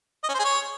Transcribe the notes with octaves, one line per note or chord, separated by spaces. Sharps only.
D#5
C#4
C5
G#4
C#5